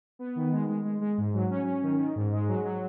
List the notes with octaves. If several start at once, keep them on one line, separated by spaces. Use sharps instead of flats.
B3
D#3
G#3
G#3
G#3
G#3
G#2
F#3
C#4
C#4
D#3
D#3
G#2
G#3
F#3
F#3